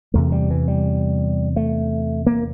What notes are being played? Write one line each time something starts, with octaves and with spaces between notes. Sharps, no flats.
E2 C3 A3
G3
E3
G3
A3
A#3